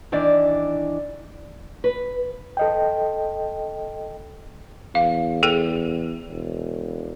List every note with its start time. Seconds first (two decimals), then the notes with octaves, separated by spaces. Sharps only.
0.12 D#3 E3 D4 D5
1.84 B4
2.57 A4 D#5 G5
4.95 E2 F5
5.43 G#4 A4 G5
6.30 E1